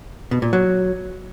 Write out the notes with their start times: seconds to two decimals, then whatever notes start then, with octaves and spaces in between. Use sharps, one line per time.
0.31 B2
0.42 A#2
0.53 F#3